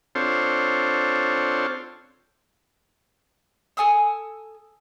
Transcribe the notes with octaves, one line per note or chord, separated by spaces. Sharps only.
C4 D4 F4 A4 C5 C#5
A4 G#5 D#6 E6